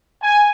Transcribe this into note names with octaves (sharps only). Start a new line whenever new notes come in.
G#5